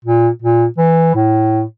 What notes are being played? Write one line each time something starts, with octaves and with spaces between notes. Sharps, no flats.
A#2
A#2
E3
A2